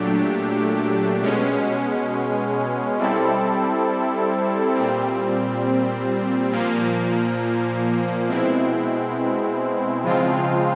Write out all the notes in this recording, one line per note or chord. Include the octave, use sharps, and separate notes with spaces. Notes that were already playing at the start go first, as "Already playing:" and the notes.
Already playing: A#2 F#3 A3 D4 G4
B2 G#3 C#4
G3 C4 E4 A4
A#2 G3 C4
A#2 F3 A#3
B2 G#3 C4 E4
C#3 F3 G#3 C4 F4